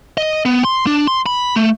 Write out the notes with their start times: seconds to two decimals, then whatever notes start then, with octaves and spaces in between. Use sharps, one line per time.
0.17 D#5
0.45 B3
0.64 C6
0.87 D4
1.07 C6
1.26 B5
1.56 A3